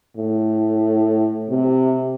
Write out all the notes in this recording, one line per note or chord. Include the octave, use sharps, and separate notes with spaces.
A2
C3